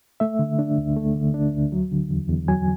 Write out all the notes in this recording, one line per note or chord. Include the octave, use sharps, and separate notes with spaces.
A3 E5
D3
D4
D2
A3
D3
D4
D2
F#3
D3
E2
E2
F#3 G#5